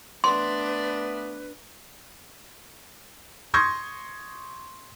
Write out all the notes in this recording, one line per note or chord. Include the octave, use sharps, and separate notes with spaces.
A3 B3 D4 B4 D5 C6
C6 C#6 D#6 G6 G#6 A#6